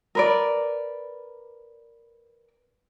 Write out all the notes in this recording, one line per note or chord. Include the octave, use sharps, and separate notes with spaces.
A#4 B4 D5